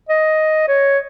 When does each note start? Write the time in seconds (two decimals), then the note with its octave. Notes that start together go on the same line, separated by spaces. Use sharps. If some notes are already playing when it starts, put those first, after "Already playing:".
0.09 D#5
0.68 C#5